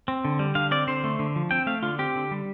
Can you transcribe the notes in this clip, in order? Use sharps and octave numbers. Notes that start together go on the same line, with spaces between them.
C4
D3
G3
D3 F5
C4 D5
D3 C5
A3
D3
F3
C4 G5
A3 F5
D3 F4
C4 G4
D3
G3